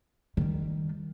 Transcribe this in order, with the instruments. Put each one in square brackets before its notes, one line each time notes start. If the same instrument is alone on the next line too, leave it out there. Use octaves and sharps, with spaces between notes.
[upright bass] D#3 G3